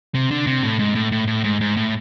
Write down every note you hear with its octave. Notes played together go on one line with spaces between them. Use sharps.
C3
D3
C3
A2
G#2
A2
A2
A2
G#2
G#2
A2